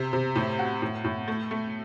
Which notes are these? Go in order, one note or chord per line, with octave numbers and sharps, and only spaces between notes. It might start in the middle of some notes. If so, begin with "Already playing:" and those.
Already playing: C3
C3
A2
F#4
A2
A2
A3
A3